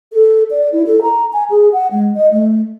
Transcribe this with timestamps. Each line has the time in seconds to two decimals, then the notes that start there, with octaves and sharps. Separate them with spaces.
0.13 A4
0.51 D5
0.73 E4
0.85 A4
1.02 A#5
1.33 G#5
1.50 G#4
1.73 F#5
1.91 G#3
2.15 D#5
2.31 A3